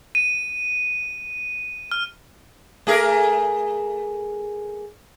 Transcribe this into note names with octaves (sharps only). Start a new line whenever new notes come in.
D#7
F6
A3 G#4 A#4